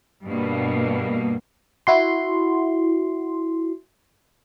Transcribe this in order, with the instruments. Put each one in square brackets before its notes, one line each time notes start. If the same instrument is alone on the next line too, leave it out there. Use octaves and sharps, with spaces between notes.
[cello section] G2 B2 A#3
[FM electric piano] E4 F#4 C6